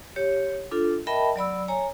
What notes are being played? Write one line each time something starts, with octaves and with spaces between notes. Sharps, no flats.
G4 C#5
D4 F4 A4
A#4 D#5 E5 G5 A5 B5
F#3 D5 B5 E6
C#5 G#5 A#5